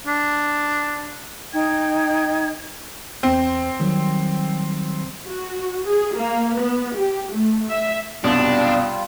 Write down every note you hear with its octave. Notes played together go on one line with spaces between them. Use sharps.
D4
D#4 G5 G#6
E2 C4 C5
D#3 F#3 G3
F#4
G#4
A#3
B3
G4
A3
E5
C2 F#2 B2 G3 D4 F4